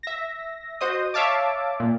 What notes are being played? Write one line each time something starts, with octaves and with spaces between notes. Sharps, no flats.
E5 A#6
F#4 C5 D#5 D#6
C#5 E5 F5 A5 D6
A#2